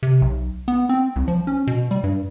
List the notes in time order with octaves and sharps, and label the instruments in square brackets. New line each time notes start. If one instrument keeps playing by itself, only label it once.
[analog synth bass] C3
B1
B3
C4
C2
F3
C#4
B2
G3
G2